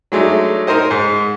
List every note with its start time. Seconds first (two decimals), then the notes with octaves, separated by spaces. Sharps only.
0.12 F#3 G#3 A3 D4 D#4
0.67 D#4 A#4 C5 D#5
0.91 G#2